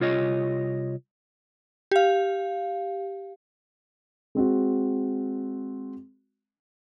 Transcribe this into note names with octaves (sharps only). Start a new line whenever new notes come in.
C2 F4 C#5 D#5
G4 F5
G#3 C4 F#4